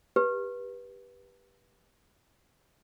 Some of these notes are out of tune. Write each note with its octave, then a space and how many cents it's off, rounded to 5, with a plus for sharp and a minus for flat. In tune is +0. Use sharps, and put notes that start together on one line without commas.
G4 +10 B4 -15